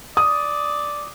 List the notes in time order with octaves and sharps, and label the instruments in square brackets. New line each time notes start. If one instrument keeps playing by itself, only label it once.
[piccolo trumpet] D5 [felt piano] D#6